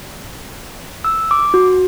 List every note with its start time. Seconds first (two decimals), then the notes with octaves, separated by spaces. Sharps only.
1.04 E6
1.31 D6
1.54 F#4